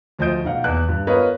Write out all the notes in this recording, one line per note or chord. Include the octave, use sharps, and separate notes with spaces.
D2 F3 D#5 G6 D7
B1 D#4 F5 F#5
E2 F#6
G2
B3 F4 A#4 B4 C#5 D#5